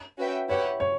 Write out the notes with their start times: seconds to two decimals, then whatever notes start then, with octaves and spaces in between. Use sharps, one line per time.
0.18 C#4 F#4 B4 E5 G5
0.49 E4 G4 B4 C#5 F#5
0.80 C#5